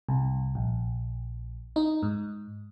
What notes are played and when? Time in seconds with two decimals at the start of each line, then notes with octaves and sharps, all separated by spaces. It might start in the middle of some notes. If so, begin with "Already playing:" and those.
0.09 C2
0.55 A#1
1.76 D#4
2.03 G#2